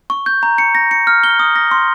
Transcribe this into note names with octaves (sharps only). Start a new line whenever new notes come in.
C#6
G6
A#5
C#7
A#6
C#7
F6
G7
D#6
A#6
C6